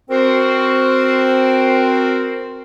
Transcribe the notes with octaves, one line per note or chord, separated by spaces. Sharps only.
C4 F#4 A#4 C5